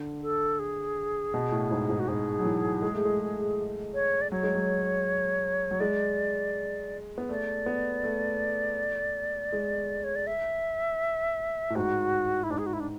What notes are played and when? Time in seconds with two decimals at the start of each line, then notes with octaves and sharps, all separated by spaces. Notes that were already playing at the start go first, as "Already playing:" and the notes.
Already playing: D3
0.22 A4
0.59 G#4
1.34 B2
1.52 A2
1.71 G#2
1.89 G#2
2.00 F#4
2.08 G#2 G#4
2.39 F#3
2.45 E3
2.82 G#3
2.94 A3
3.05 G#3
3.94 C#5
4.21 D5
4.31 F#3 C#5
4.43 G#3
4.55 F#3
5.71 F#3
5.80 G#3 D5
7.18 B3
7.29 A3 D5
7.66 B3
8.04 A3
9.52 G#3
10.04 C#5
10.16 D5
10.27 E5
11.70 A2
11.76 G#2 F#4
12.44 E4
12.51 G#2 D4
12.58 G#4
12.66 F#4
12.73 E4
12.80 D4